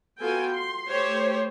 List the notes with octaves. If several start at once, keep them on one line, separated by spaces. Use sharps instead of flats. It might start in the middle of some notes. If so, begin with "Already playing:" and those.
B3 F4 F#4 A4 G5 G#5
C6
A3 G4 C5 C#5